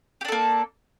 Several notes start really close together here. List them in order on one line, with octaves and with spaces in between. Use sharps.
G4 D4 A4 A#3